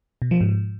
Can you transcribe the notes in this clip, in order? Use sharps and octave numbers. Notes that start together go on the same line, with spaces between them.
B2
F3
G#2